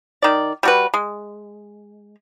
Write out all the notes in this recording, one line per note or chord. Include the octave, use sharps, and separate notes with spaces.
D#3 D5
G3 F#4 B4
G#3